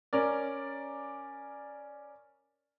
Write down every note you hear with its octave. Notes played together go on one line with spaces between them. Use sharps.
C#4 A#4 D5